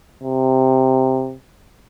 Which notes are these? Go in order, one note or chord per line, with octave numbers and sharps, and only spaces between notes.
C3